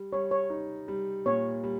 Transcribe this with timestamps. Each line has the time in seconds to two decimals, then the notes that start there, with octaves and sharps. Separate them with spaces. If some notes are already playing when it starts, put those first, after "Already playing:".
Already playing: G3
0.13 G3 C#5
0.31 C#5
0.50 D#4
0.88 G3
1.26 A#2 C#5
1.64 G3